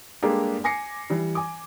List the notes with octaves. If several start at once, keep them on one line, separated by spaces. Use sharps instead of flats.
G3 G#3 A#3 D4 G4 A4
G#5 D6 A#6 C7 C#7
E3 G3
G#5 D6